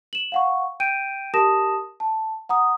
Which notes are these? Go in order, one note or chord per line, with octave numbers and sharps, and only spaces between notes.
E7 F#7
F5 F#5 C#6
G5 G6 D7 D#7
G4 A#4 A5 D#6 A#6 E7
A5
F#5 A#5 D#6